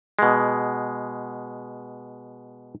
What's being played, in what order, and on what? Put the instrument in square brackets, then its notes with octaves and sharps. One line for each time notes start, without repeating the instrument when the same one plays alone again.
[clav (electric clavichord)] B2 G#3